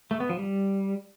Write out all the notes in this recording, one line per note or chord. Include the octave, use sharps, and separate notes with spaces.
A3
B3
F3
G3